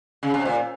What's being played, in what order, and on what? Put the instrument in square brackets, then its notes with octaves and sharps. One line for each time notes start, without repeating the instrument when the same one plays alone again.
[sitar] C#3
C3
A#2